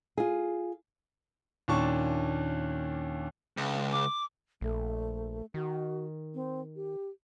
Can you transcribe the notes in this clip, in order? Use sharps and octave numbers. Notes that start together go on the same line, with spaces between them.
F4 G#4
D#2 A#2 C#4 D4 A5 C#6
C#2
D6
A#1 A3
D#3 F#4
C4
G4